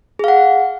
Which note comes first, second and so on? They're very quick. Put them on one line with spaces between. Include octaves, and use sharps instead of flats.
G#4 F5 F#5